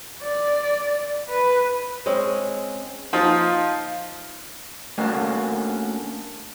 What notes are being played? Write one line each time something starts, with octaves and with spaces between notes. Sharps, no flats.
D5
B4
G#3 C4 C#4
F3 D#4 F4
A3 A#3 C#4 D4 F#4